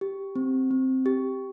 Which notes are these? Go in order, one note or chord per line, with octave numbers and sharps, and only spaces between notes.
G4
C4
C4
G4